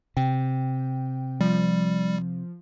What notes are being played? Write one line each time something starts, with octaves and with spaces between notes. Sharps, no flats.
C3 G5
F3 G3